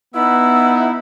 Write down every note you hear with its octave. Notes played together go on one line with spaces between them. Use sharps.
B3 D#4 E4 E6